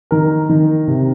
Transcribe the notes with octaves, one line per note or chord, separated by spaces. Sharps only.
D#3 A#4
D#3
C3